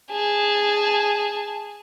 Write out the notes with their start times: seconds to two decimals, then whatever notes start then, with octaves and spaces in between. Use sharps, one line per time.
0.11 G#4 A5